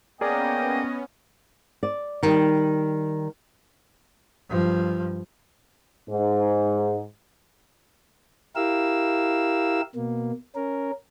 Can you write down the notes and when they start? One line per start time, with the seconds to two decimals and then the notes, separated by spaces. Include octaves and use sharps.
0.21 A#3 B3 C#4 G#4 A#4 D5 D#5 G5
1.83 D5
2.23 D#3 G3
4.49 G2 F3
6.10 G#2
8.56 E4 G4 A#4 F5 E6
9.95 B2 A#3
10.55 C#4 A#4